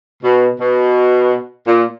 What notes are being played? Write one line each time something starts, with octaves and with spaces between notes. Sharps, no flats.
B2
B2
A#2